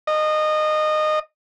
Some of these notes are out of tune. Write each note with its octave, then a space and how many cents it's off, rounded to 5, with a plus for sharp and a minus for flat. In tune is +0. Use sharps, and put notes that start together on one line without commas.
D#5 -20